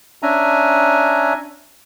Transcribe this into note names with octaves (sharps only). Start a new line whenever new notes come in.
C#4 D4 E5 G#5 A#5